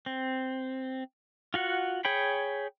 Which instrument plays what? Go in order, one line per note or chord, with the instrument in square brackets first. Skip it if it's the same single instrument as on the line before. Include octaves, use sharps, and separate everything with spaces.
[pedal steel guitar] C4
F4 F#4 F#5
G#4 C#5 G5 B5